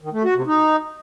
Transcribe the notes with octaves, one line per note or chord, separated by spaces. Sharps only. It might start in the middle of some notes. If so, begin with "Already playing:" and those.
D#3
A3
F#4
C3
D#4